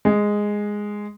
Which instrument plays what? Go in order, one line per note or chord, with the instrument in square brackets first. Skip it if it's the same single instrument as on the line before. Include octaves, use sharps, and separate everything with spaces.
[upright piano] G#3